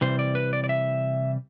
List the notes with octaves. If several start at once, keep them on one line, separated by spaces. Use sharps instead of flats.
C3 E3 G3 C5
D5
B4
D5
D5
E5